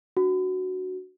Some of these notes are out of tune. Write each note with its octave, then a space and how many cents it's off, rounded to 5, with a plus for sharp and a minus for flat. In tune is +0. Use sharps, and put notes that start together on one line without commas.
D4 +0 F#4 +0